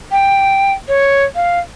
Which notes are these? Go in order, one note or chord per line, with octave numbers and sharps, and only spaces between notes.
G5
C#5
F5